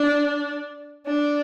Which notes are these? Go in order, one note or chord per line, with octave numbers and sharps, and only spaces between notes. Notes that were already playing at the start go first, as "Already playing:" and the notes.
Already playing: D4
D4